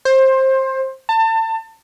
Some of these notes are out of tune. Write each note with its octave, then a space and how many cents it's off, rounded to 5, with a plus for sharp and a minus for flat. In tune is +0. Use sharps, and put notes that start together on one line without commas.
C5 +20
A5 +30